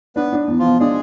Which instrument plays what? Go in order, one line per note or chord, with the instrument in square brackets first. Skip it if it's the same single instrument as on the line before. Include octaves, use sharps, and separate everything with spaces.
[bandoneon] B3 B4 [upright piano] D4
[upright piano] D4
E2
[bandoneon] F3 F4
[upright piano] B2
[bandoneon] G#3 G#4 [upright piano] D4